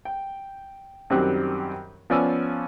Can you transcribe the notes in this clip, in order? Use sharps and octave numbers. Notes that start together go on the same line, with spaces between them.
G5
F#2 D#3 G3 C4 G4 F#6
F3 B3 C#4 D5 G#5 E6